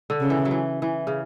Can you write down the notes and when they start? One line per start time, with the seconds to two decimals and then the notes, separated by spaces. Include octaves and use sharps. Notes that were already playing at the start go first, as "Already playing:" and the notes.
0.10 D3
0.20 C#3
0.30 E3
0.45 F#3
0.51 E3
0.82 E3
1.07 C#3